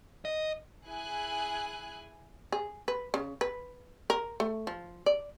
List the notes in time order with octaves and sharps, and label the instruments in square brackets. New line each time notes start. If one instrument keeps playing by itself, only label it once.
[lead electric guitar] D#5
[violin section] E4 G#4 G#5 F#6
[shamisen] G#4
B4
C#3
B4
A#4
A3
F3
D5